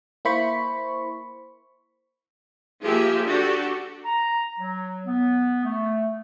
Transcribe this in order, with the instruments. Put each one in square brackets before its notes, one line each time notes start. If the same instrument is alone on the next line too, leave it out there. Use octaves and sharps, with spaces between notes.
[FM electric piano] A#3 E4 C5 B5 C#6
[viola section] F3 A#3 G4 G#4 E5
D4 F#4 G4 A4
[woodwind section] A#5
F#3
B3
A3